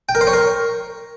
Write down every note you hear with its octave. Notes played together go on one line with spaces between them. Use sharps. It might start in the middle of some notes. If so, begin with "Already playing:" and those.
G5
A#4
C5
C#5
A#4